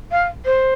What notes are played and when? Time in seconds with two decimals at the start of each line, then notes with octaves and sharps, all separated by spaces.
0.11 F5
0.45 C5